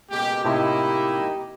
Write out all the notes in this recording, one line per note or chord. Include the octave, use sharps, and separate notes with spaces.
C#2 B2 G#3 A#3 G4
A2 C3 A#3 D#4 E4 G4 D#5